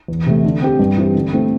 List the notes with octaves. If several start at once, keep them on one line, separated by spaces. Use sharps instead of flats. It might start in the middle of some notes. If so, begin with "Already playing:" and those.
E2
C3 A3
D3
C4 G4
G2
E3 C4 G4
D3
A3 C4 E4